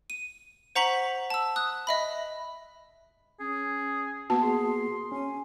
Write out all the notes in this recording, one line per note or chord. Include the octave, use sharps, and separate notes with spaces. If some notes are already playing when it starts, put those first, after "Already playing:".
D#7
C5 F#5 A#5 C#6 B6 F#7
A5 E6
D#6 F#6
D#5 E5 B5
C#4 G#4
A#3 B3 F#4 A5
G#4 C6
C#4 G#5